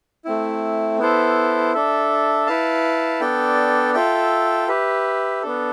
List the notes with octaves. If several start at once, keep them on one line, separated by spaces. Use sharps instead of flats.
A3 C4 E4
B3 E4 A4 C5
D4 A4 E5
E4 B4 F5 A5
B3 D4 A4 D5 G5
F4 A4 E5 G5
G4 B4 E5
B3 D4 A4